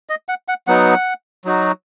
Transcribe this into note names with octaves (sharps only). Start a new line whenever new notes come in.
D#5
F#5
F#5
F#3 B3 D#4 F#5
F#3 D#4 F#4